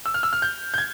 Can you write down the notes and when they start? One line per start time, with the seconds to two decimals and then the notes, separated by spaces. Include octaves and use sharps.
0.06 E6
0.14 F6
0.23 E6
0.33 F6
0.42 G6
0.74 G6
0.78 G#6